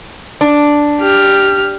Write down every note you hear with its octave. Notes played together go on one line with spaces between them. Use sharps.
D4
G4 F6